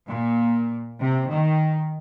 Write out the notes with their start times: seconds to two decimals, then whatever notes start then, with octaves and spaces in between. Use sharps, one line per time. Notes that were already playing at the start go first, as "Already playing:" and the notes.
0.09 A#2
1.01 C3
1.32 D#3